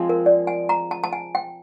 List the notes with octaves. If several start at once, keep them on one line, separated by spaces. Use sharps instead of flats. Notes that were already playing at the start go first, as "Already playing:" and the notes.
Already playing: F3 G#3 C4
A#4
D5
G#5
A#5
A5
A5
G#5
G5